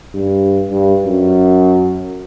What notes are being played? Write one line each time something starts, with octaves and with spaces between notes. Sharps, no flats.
G2
G2
F#2